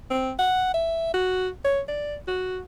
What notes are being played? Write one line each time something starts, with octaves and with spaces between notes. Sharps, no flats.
C4
F#5
E5
F#4
C#5
D5
F#4